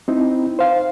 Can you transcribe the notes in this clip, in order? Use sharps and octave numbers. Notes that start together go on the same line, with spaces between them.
C4 D#4 E4
C5 F5